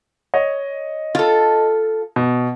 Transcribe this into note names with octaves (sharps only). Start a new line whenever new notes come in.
C#5 D#5
F4 A4
B2